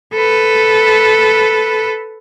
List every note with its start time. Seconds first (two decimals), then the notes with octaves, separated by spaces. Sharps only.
0.13 A4 B4